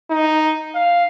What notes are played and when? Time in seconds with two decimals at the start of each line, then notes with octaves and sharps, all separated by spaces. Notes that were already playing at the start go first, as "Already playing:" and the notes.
0.11 D#4
0.75 F5